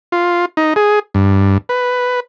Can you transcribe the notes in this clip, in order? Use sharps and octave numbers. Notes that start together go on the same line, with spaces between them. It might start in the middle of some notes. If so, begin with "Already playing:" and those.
F4
D#4
G#4
G2
B4